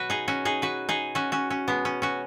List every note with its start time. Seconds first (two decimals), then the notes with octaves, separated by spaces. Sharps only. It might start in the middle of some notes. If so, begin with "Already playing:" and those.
Already playing: B2 F#3 F#4 B4
0.10 D#4 G#4
0.28 C#4 F#4
0.45 D#4 G#4
0.62 F#4 B4
0.89 D#4 G#4
1.15 C#4 F#4
1.32 C#4 F#4
1.50 C#4
1.68 B2 G#3 B3
1.85 C#4
2.02 C#4 F#4